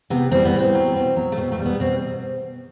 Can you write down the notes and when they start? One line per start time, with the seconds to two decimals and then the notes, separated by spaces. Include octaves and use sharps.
0.10 C3 B3
0.32 E3 G3 C4
0.45 B3
0.53 A2
0.59 C4
0.74 F#3
0.96 B2
1.17 F#3
1.32 A3
1.37 B2 B3
1.52 A3
1.59 G3
1.66 B3
1.80 B2 C4